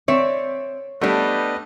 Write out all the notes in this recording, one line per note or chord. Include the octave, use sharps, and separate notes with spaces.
C4 C#5 D5 E5
G3 A3 B3 D4 B4 D#5